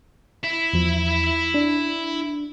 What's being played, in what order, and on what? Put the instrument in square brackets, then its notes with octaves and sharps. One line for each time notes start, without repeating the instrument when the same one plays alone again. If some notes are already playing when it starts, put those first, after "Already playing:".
[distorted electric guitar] E4 E5
[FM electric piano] E2 F3
D4